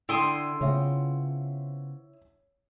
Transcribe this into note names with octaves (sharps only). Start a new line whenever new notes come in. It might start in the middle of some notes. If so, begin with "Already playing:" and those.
D3 E4 G5 A5 C6 D#6
C#3 B3 C4 F4 C#5 E5